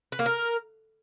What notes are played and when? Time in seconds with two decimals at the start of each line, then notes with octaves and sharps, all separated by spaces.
0.12 B4
0.19 A#3
0.26 A#4